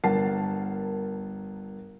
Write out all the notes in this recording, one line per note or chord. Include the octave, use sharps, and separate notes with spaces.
G1 A#4 F#5 A5 C7